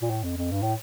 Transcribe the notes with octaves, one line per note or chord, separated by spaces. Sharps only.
A#2
A2
F2
F2
G2
A2